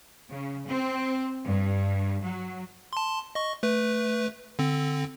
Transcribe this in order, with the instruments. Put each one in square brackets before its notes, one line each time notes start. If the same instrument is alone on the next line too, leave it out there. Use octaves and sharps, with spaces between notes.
[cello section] C#3
C4
G2
F#3
[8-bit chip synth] A5 C6
D#5 C#6
A3 B4
D3 C4